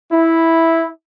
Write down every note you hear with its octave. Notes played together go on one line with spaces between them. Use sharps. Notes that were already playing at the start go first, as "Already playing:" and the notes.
E4